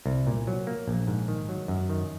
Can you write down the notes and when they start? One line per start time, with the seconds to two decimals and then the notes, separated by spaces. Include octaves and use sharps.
0.06 C2
0.27 A#2
0.47 F#3
0.67 A#3
0.88 A#1
1.07 G#2
1.28 D#3
1.49 F#3
1.68 F#2
1.90 D#3